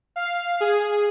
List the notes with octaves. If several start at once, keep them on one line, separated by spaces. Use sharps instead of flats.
F5
G#4